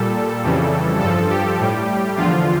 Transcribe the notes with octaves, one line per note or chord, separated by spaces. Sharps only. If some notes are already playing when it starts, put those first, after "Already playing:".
Already playing: A#2 G3 A4
F2 C#3 E3 G3
G2 F3 A4
G4
A2 G3
E2 D3 F3 F4